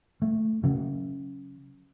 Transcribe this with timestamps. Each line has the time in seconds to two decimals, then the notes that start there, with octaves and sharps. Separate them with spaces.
0.22 A3
0.63 C#3 F#3